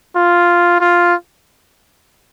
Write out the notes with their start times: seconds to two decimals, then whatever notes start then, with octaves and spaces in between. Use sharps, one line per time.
0.17 F4
0.80 F4